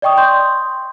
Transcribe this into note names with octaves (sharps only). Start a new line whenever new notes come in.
D5 D#5 G5 C#6 D#6
C6 G6